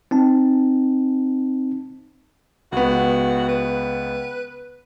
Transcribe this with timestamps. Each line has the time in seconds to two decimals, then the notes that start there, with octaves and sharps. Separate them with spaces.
0.11 C4 D#4 A5
2.72 C#2 B3 F#4
3.48 B4